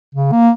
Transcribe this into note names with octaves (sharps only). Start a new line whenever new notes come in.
C#3
A#3